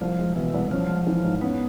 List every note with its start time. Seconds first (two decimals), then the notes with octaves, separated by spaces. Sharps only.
0.01 C2 F3
0.18 G#3
0.36 B2 E3
0.54 C2
0.71 F3 C#4
0.89 G#3
1.07 E3
1.24 G#2
1.41 B3 C#4